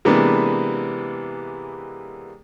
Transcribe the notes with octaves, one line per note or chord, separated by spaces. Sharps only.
C3 E3 G#3 A#3 B3 D4